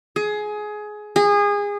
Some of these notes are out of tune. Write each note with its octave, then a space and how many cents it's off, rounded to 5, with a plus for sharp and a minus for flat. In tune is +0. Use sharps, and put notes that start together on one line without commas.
G#4 +20
G#4 -25